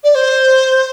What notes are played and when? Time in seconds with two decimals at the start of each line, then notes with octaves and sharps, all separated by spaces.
0.03 D5
0.15 C5